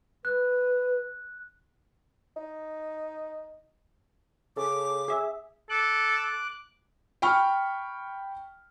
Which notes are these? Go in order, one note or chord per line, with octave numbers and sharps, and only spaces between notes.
B4 F#6
D#4
C#3 A4 D6
G#4 E5
A4 D6 F#6
G5 B5 C#6 F6